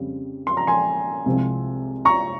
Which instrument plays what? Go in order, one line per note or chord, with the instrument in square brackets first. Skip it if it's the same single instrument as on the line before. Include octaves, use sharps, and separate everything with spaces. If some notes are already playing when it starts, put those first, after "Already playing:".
Already playing: [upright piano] F2 C#3 G3 C4
C6
A#5
G#5 C6
C2 C3 F3 G#3
A#5 C#6